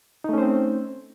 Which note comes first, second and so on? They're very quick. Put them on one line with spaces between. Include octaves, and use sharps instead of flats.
D#4 A3 C#4 C5 C4